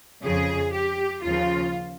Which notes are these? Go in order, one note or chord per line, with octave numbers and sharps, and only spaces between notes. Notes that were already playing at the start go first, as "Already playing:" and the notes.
F2 C#3 F3 G#4
G4
D#2 C#3 F3 F4